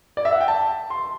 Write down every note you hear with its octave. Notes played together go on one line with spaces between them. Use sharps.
D5
E5
F#5
G5
A5
C6